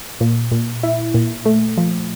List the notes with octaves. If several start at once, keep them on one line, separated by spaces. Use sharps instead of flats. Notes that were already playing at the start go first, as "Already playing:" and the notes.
A#2
A#2
E4
A#2
A3
F3